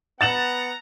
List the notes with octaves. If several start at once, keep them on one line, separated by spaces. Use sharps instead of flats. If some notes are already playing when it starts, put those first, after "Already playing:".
B3 F#5 A#5 A6 E7 F#7